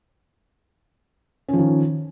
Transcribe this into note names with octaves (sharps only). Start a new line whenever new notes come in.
D#3 F3 C#4